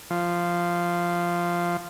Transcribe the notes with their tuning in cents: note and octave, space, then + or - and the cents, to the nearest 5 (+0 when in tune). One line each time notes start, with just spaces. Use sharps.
F3 -5